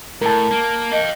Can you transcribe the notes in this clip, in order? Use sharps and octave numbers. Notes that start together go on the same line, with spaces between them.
A2 A#4 A5
A#3
D#5 F5 G5